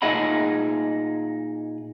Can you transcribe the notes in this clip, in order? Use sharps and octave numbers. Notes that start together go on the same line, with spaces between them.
A#2 D#4 G#4 D#5 F#5 B5